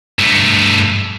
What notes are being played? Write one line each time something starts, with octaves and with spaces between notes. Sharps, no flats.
G2 A3